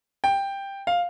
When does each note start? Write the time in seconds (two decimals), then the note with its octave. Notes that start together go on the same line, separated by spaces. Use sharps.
0.24 G5
0.87 F5